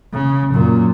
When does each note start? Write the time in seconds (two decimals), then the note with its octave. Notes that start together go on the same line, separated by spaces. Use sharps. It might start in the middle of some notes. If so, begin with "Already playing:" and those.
0.13 C#3
0.53 F#2 A#2